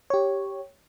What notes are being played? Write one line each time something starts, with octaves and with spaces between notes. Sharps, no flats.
G4 C#5